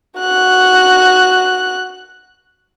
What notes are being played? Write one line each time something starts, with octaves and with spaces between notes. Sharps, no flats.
F#4 F#6